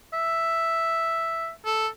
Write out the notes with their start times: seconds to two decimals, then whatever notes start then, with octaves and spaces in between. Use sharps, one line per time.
0.13 E5
1.65 A4